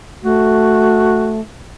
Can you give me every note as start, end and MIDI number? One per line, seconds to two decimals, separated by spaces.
0.23 1.41 57
0.23 1.37 66